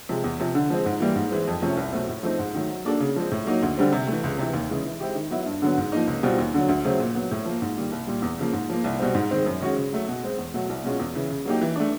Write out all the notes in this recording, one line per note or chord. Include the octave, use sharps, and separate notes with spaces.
C3 F3 G#3
E2
C3 F3
D3
F3 G#3 C4
G#2
E3 G3 A#3
G#2
E3 G#3 C4
F2
C3 F3 A3 C#4
C2
B2 F#3 A3 C4
A2
F3 A3 C4 D#4
G#2
D#3 F#3 A3
F#3
A#3 D4 F#4 A4
C#3
F3 G#3 C4
A2
F#3 A#3 D#4
D2
D3 G3 C4
C3
E3 A3
C#2
C3 E3
D#2
C#3 E3 G#3
E3
G#3 C4 E4 G4
D#3
F#3 B3 E4
G2
D3 F#3 B3
G#2
F3 A#3 D#4
C#2
B2 G3 C4 F4
D#2
D3 F#3
D2
C#3 F#3 A3 C4
A#2
F#3 B3
A2
F3 A#3
G#2
D#3 G3 A#3
C2
A#2 G3
E2
C#3 F3 A#3
G#2
F3 A#3
C2
B2 G3 C4
G#2
D#3 G#3 C4
F#2
D#3 G#3 C#4 F#4
C#3
F#3 A3
B2
G#3 C4
E2
B2 F#3 A3
C2
B2 G#3 C#4 F4
E2
C#3 E3
C#3
F#3 A#3 D#4 G4
E3
A3 D4